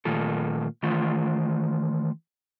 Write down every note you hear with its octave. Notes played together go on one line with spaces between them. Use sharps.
A#2 D#3 A3 F4 A4
D#3 E3 A3 F4